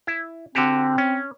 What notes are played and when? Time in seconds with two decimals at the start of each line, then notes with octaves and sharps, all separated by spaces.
0.07 E4
0.55 D3 C4 F#4 G4
0.98 C#4